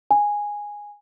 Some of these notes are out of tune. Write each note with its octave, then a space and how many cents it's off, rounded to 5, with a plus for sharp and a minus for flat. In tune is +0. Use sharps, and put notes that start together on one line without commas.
G#5 -5